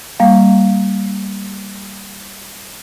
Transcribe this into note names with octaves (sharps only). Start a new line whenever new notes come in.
G3 A#3 F5